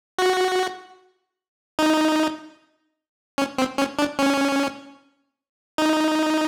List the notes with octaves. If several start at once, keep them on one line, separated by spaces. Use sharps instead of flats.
F#4
D#4
C#4
C4
C#4
D4
C#4
D#4